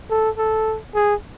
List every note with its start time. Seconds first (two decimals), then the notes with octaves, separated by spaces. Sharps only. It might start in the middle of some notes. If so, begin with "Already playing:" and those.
0.10 A4
0.38 A4
0.95 G#4